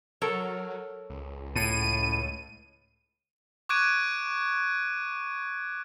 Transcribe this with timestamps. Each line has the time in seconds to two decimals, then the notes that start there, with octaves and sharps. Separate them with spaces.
0.22 F#3 A4 A#4 C#5
1.10 C#2
1.56 A2 D#7
3.69 C#6 D6 F#6 G#6 D7 D#7